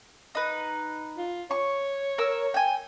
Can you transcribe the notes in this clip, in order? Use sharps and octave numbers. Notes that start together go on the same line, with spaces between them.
D#4 B4
F4
C#5 C#6
A#4 E6
G5 G#5